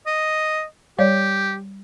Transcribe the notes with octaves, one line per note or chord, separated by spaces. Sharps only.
D#5
G3 G4 C#5 D5